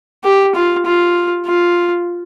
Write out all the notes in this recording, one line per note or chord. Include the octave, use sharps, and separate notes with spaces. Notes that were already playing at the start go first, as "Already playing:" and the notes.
G4
F4
F4
F4